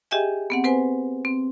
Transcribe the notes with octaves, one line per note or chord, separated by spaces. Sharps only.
G4 G#4 D#5 E5 G5 G#5
B3 C4 F#5
C4 B4 C5 G#5
C4